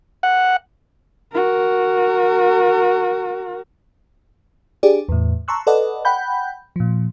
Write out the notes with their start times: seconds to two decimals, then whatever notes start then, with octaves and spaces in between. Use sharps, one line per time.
0.23 F#5
1.32 F#4 A#4
4.83 D4 G4 G#4 D5
5.09 E2 A2
5.48 A5 A#5 C6 C#6 E6 F#6
5.67 A4 B4 D5 D#5 F#5
6.05 F#5 G5 B5 G6
6.76 A#2 F3